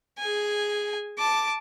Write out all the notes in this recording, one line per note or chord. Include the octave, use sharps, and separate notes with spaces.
G#4 G#5
A5 D6